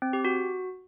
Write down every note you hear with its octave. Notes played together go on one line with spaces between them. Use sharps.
C4
G4
F#4